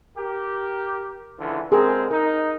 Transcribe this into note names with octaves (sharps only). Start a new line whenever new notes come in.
G4 A#4
C#2 D3 E3
D3 G#3 C4 G#4 A#4
D#4 A#4